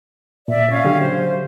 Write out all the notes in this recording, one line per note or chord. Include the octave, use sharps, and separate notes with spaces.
A#2 D5 E5
C#4 F5
D3 F#3 G4
C5